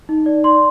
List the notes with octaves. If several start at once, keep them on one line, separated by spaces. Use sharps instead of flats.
D#4
D5
D5 C6